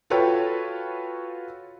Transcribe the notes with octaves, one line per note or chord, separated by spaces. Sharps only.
F4 F#4 A4 B4 C#5 G5